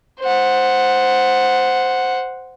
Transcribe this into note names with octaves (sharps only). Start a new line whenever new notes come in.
C5 F#5